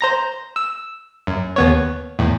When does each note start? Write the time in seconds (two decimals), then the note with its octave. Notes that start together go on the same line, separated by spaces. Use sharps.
0.01 C5 A#5 A#6
0.56 E6
1.27 F#2
1.56 D#2 B3 C#5
2.19 E2 A2